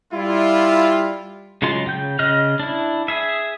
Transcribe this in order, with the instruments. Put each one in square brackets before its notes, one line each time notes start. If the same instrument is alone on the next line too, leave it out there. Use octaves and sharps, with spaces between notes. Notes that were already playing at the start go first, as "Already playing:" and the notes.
[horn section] G3 E4 F4
[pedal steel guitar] C#3 F#3 G#3 F4 C6
C#3 G5 G6
C#3 D#5 F6 F#6
D4 E4
G#4 E5